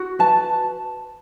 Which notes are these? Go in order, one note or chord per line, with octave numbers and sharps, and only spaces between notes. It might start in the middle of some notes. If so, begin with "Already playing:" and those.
Already playing: F#4
B4 A5